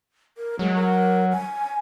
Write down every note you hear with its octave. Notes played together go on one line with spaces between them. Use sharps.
A#4
F#3 G#3
A#4
G#5